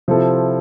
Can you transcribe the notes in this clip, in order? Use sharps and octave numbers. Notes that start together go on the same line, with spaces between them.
C3 F3 C4 E4 A4